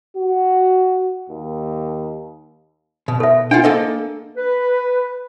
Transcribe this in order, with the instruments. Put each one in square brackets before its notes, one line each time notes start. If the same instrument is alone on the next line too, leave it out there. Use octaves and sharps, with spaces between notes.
[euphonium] F#4
D#2
[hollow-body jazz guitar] B2
[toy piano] A4 E5
[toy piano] D4 [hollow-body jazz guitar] F4 F#5 G5
[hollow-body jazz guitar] A#3 A4 D#5
[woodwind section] B4